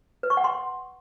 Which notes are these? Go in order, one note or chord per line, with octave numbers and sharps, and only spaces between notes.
B4
C#6
F#5
C6